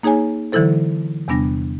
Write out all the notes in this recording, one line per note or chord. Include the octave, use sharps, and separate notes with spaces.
A#3 D#4 G#4 C#5 G#5
D3 E3 F#3 E4 A4 C5
E2 C3 G3 B3 D4 A#6